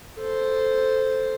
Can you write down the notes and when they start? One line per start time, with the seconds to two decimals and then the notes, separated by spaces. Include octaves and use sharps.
0.18 A4 C5